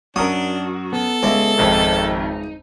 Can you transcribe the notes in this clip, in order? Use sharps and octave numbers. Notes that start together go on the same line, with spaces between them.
F#2 D4 F#4 A#4 D#6
B3 A4
C#2 E4
G#1 F2 D#3 D#4